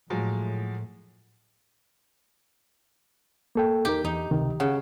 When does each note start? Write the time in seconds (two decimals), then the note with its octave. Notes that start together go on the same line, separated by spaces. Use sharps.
0.10 A2 F3 F#3 G#3
3.55 A#3 A4 G5
3.85 E2 D#4 G4 A#4
4.05 E2 D#4
4.31 C#2 C3 D#3
4.60 C#3 F#5